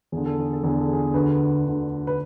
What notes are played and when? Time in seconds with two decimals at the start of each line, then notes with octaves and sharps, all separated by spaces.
0.12 E2 D3 G#4
0.26 A4
0.40 G#4
0.53 A4
0.63 E2 D3 G#4
0.79 A4
0.93 G#4
1.14 D2 D3 B4
1.64 D2 D3
2.07 B4